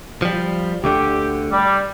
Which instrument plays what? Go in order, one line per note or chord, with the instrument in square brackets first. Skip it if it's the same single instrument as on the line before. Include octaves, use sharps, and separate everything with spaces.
[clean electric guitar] F3 G3
[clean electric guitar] D2 D3 [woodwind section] G4
[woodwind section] G3